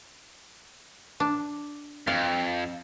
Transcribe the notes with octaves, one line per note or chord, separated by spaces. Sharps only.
D4
F2 F5